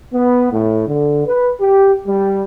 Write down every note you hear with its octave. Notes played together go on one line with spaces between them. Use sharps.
B3
A2
D3
B4
G4
G3